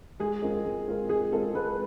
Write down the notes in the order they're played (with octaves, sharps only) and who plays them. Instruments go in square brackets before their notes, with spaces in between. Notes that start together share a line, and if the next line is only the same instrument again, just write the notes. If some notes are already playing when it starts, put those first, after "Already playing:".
[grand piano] G#3 [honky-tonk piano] G#4
[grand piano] C4 F4 A#4 D#5
G#3
C4 F4 A#4 D#5
[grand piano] G#3 [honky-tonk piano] G#4
[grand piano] C4 F4 A#4 D#5 [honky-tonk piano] A4
[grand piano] G#3 [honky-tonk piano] B4